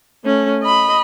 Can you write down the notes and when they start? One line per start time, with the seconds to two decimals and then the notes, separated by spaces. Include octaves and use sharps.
0.25 A3 C#4
0.62 D#5 B5